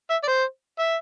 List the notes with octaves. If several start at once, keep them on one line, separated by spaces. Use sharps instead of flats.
E5
D5
C5
E5